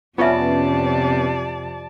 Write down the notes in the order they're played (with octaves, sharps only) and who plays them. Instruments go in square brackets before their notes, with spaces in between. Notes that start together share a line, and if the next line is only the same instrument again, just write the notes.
[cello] F2 C3 [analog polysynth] B3 C#4 [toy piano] F4 E5 [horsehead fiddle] D5 A5